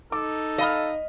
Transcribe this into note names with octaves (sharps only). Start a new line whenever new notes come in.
D#4 A4 D6
D#5 F5 B5 F6